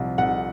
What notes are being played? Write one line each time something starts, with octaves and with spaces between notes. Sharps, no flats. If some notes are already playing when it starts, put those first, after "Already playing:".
Already playing: C2 C3 F3
C2 F#5